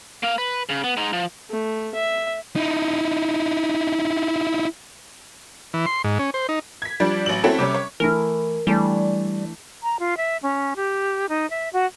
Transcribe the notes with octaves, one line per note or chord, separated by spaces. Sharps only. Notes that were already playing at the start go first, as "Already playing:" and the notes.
A#3 F5
B4
C#3
B3
G#3 D#4
F3
A3
E5
D#4 E4
E3
C6
G#2
C#4
C5
D#4
G#6 B6
F3 G3 D4
A1 F#3 F#7
C4 C#4 E4 F#4 A4
C3 G3 C#4
C#5
E3 A3 E4 A#4
E3 G3 A3 D4
A#5
F4
E5
C#4
G4
D#4
E5
F#4